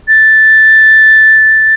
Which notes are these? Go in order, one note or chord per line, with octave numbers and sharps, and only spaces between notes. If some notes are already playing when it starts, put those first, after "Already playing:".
A6